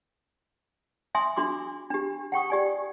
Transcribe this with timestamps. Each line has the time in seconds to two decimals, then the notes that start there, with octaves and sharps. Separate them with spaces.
1.15 E5 G#5 C6 D#6
1.36 D4 F#4 C6 D6
1.90 D4 G4
2.32 F#5 G5 C#6 D#6
2.50 G4 D5 G#5